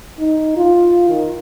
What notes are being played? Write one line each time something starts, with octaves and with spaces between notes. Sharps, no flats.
D#4
F4
D#3